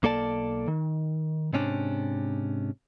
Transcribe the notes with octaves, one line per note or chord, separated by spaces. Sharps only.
B1 A#3 A4 D5 A5
D#3
G#2 C3 C#4 D4